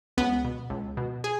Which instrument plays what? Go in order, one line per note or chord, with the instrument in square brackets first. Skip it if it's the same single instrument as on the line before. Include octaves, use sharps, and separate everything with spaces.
[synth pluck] C#2 B3
B2
C#2
B2
G#4